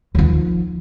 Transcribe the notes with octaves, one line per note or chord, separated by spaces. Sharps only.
D#2 F3